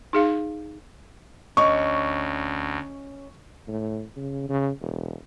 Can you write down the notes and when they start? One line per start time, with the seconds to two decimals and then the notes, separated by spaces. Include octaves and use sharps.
0.13 D#4 G#4 F5
1.57 D2 C#4 D#5 C#6
3.68 A2
4.16 C#3
4.49 C#3
4.82 E1